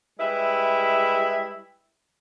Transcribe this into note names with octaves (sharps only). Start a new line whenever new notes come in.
G3 G#3 E4 B4 E5